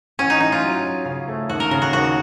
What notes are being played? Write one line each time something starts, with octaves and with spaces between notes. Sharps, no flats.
A1 C#4
D#4
A2 D#4
F4
F#3
F#3
C#3
A3
D#2 F#4
A#4
C#3 A#4
F#4
D#2 F#4